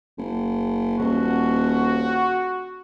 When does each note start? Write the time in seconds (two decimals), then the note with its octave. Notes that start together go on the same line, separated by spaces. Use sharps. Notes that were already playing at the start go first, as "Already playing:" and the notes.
0.18 F#1
0.99 D#1 F#4